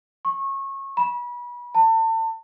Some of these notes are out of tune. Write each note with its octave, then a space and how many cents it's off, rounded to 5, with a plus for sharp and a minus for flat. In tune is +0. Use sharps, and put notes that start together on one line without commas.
C#6 -25
B5 -30
A5 +35